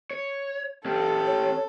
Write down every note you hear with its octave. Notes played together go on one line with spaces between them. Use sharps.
C#5
C#4 G4 A4
C#5